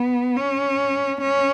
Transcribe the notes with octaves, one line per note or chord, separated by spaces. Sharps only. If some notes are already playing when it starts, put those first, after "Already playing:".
Already playing: B3
C#4
C#4